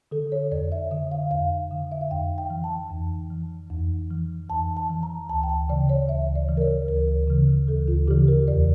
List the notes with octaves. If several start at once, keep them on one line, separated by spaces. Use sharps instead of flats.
D3 A4
C#5
F2 D5
E5
D3 E5
F5
F2 F5
D3
E5
F5
F2 G5
G5
E3
A5
F2
E3
F2
E3
F2 A5
A5
E3
A#5
D2 A5
G5
A5
C#3 E3 D5
C#5
D2 E5
D5
C#3 E3
A#4
C#5
D2 A#4
C#3 E3
D2 A4
F4
C#3 E3 G4
A#4
E2 D5